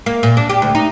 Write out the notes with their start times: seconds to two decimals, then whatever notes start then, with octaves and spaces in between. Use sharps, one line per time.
0.06 A#3
0.23 A#2
0.37 D4
0.50 G4
0.62 D2
0.75 D#4